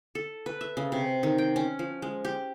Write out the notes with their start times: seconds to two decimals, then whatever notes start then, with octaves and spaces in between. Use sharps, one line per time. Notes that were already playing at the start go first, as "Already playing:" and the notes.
0.15 A4
0.46 B4
0.61 E5
0.77 C#3
0.92 C3
1.23 D#3
1.38 G5
1.56 C#4
1.79 F3
2.02 G#3
2.25 G4